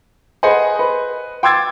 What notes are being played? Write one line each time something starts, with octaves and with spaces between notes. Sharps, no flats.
G#4 B4 C5 D#5 F#5 G#5
B4
G5 C6 D6 E6 G#6 A6